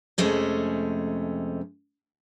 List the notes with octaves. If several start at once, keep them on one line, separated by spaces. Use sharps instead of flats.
F2 C3 G#3 A3 C#4